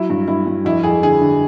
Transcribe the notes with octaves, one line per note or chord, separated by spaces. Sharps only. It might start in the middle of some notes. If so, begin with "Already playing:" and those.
Already playing: F#3 E4
G2
G2 E4
G2
F2 E4
F2 G#4
D3 G#4
D3